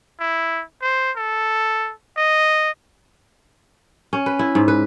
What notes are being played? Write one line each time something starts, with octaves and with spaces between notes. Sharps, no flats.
E4
C5
A4
D#5
C#4
B4
E4
G#2
B4